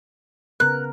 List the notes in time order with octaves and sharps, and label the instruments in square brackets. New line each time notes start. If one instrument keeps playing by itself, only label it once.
[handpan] C#3 B3 A#4 [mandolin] F#6